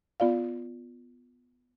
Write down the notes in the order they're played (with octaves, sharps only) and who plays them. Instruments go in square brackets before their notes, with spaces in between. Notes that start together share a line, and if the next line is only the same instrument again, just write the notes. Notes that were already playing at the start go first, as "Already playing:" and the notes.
[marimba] B3 F4 D5 F5